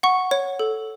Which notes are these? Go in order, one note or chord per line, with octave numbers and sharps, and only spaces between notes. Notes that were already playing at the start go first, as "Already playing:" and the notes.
F#5 C#6
C#5
A4